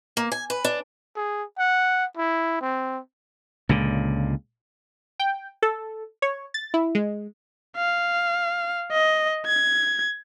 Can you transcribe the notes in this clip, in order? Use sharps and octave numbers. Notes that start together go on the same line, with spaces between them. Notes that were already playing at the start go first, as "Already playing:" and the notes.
A#3
G#5
B4
D4
G#4
F#5
E4
C4
C#2 A#2 D3
G5
A4
C#5
A6
E4
G#3
F5
D#5
G#6